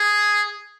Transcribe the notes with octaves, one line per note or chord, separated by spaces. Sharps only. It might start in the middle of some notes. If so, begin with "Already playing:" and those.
Already playing: G#4